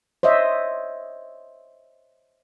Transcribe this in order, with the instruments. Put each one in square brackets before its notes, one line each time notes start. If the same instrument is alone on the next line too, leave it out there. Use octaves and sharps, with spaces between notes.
[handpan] C5 C#5 D#5 E5